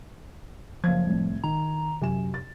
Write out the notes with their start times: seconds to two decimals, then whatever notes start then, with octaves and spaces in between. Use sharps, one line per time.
0.84 F#1 F3 F5 G#6
1.06 C2 A2
1.44 D#3 A#5
2.02 F#2 C3 G#5 E7
2.34 A6